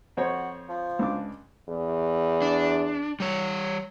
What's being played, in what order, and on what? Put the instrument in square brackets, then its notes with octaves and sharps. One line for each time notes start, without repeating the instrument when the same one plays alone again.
[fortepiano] F2 C5 C#5 [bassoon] F#4
[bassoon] F3
[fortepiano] C#2 D4 D6
[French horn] E2
[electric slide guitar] D4
G3 C#5